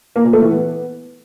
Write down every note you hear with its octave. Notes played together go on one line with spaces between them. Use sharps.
A#3
A#2
A3
E3
B3